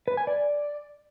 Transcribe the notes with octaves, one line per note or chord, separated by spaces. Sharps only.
B4
G#5
D5